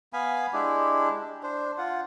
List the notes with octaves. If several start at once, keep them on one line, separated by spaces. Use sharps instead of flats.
B3 F5 G#5 B5
G#3 D4 E4 G4
D4 C5
F4 F#5